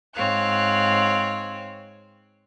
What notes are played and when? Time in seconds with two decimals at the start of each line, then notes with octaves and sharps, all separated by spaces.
0.15 G#2 C4 C#5 F5 F#6